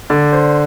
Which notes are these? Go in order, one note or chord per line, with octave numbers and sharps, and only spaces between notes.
D3 D5
C5